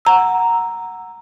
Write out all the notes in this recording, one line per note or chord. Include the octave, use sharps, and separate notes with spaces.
F#5 A#5 E6